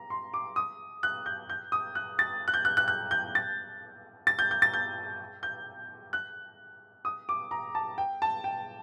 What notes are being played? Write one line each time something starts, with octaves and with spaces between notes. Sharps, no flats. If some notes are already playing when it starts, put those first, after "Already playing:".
Already playing: A#5
C6
D6
D#6
F#6
G6
G6
D#6
F#6
A6
F#6
G6
F#6
F#6
F#6
G6
A6
A6
G6
G6
A6
G6
G6
F#6
D#6
D6
A#5
A5
G5
A5
G5